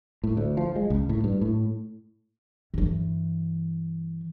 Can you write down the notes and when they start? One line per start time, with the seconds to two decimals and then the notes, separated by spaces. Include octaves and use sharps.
0.24 A2
0.37 D2
0.57 F3
0.76 G#3
0.90 C#2
1.09 A2
1.24 G2
1.41 A2
2.74 G2 E3